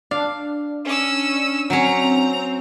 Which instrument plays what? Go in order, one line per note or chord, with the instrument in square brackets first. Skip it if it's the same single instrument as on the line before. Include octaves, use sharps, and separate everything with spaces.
[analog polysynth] D4 [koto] F5
[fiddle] C#4 E6
[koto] F#3 C#4 [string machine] C4 [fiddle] A#5